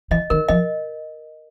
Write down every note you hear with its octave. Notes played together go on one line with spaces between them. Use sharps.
E3 D#5
D#3 A#4
F3 D#5